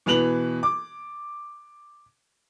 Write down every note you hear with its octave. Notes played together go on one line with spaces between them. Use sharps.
B2 E3 B4 F7 F#7
D6